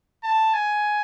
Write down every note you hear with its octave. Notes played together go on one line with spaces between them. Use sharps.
A5
G#5